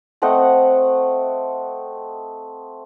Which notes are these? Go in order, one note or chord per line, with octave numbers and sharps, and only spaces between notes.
A3 C4 D#5 F#5